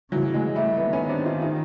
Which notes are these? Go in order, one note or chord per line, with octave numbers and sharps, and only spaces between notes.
C#3 E3 F#3
F#3 G#3
G3 A3
D#3 A3 B3
B3 C#4
C4 D4
D#4 F4
D#4 F4